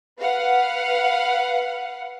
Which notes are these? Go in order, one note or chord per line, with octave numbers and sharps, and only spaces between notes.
B4 F5 F#5